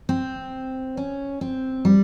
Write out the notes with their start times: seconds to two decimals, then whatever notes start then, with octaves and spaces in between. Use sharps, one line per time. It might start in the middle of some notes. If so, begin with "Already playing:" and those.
0.09 C4
0.97 C#4
1.41 C4
1.85 G3